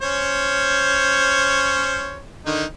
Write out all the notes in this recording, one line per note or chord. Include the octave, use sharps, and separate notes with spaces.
C#4 C5 C#5
D3 D#3 D#4